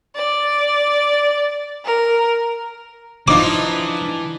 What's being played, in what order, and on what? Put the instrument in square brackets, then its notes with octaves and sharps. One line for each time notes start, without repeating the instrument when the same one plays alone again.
[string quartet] D5
A#4
[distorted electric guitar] E3 [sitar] F3 D#4 F4 [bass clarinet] D4 [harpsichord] D6